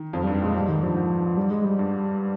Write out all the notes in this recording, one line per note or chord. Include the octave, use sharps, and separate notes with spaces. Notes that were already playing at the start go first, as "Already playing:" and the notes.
Already playing: D#3
F2 F3
G3
G2
G3
A#2 G#3
G#2 G3
G#2 D#3
G2 F3
G#2
G3
G#3
G3
G2